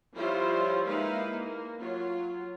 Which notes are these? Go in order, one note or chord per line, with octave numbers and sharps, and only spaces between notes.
F3 G3 E4 F4 C5 C#5
G#3 A#3 D#4 E4 B4 F5
A#3
F#3 F4